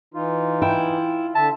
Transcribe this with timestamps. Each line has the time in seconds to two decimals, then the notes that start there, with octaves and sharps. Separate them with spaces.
0.14 E3 D#4 F4
0.62 E4 G5
1.35 D3 E5 A5